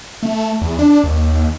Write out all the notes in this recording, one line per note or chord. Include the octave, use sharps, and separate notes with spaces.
A3
E2
D4
D#2